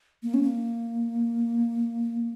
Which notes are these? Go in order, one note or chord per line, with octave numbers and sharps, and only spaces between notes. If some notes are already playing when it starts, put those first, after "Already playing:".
A#3
C#4
A#3